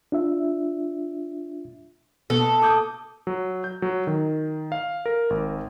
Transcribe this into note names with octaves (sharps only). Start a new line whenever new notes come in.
D4 F4 E5
B2 A4
D6 D#6 G6
F#3
G6
F#3
D#3
F5
A#4
G#1